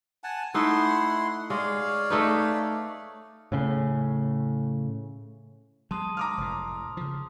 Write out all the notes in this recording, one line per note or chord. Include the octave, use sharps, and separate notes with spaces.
F#5 G#5 A5
A3 D#4 E4 F#5 C6
G#3 C#5 D5 F5
A3 D#4 B4
A2 C#3
F#3 G#3 A5 C6 D#6
A#5 D6 F6
F1 A2
C#3 F3